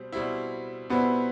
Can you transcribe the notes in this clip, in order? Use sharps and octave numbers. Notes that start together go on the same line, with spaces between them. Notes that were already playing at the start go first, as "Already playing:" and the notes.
Already playing: B2 G3 C4
B2 G3 C4 E4
B2 G3 B3 C4 E4